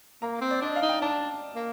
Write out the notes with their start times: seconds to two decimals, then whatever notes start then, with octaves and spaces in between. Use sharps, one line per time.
0.22 A#3 A#5
0.41 C4
0.51 D5
0.62 D4 D#5
0.76 F5
0.82 D#4
0.89 G5
1.02 D4 A5
1.56 A#3